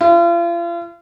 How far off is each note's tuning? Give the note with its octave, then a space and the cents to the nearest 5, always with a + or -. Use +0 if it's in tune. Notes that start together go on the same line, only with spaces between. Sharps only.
F4 -40